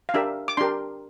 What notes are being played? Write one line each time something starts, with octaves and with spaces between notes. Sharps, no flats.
F5
D4 G4 A#4 E5
D6
D4 G4 A#4 C6